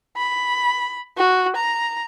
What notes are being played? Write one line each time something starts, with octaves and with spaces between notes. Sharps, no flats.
B5
F#4
A#5